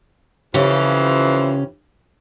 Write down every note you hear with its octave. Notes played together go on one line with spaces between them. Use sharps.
F2 C#3 E3 F3 C#4 G4